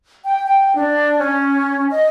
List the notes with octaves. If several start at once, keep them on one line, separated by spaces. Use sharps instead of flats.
G5
G5
D4
C#4
D#5